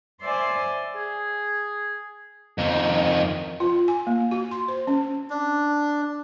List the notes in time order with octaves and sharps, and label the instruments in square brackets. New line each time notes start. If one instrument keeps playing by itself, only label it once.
[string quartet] C5 D5 E5 G#5 C6
[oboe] G#4
[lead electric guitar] F2 D#3
[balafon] F4
G#5
A#3
F#4
C6
C5
C#4
[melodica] D4